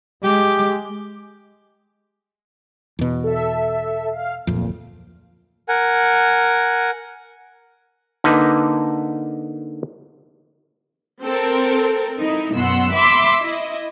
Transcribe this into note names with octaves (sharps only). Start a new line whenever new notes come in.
G#3 G4 D6
E2 B2
A4 E5
F5
D1 F2 A#2
A#4 F#5 G#5
D3 A#3 D#4 B4
C4 A4 A#4
D#4 E4
F#2 B2 F#5 C6 E6
E5 B5 C6 D6 E6
E4 D#5